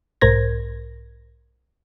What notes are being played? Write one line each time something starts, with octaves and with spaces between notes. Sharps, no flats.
B1 G#2 A#4 C5 G#6 A#6